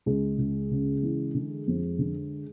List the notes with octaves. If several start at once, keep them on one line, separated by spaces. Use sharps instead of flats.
C#2 G#3 G#4
C#2
C#3
E3
D3
F2
D3